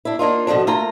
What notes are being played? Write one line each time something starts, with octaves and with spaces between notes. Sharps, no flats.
D4 E4
A#3 D4 D#4 F4
B2 D3 F3 F#3 D4
A3 A#3 F4 A#5